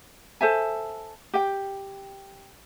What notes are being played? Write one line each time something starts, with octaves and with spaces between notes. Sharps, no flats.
A4 C5 E5 G#5
G4 G5